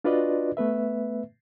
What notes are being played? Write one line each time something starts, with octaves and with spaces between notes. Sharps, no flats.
D4 F4 F#4 B4 D5 D#5
A3 B3 B4 E5